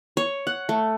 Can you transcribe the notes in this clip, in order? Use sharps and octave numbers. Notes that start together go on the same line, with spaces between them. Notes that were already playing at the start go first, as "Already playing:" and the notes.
C#5
F#5
A3